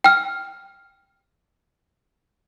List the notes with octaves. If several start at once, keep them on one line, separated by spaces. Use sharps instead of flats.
G5 F6